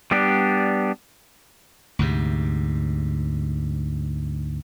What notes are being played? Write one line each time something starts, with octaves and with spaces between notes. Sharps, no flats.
G3 B3 D4 G4
D2 G#2 C3